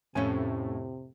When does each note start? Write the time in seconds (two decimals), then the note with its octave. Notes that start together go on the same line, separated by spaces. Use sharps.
0.15 F2 A2 C3 C#4 G#5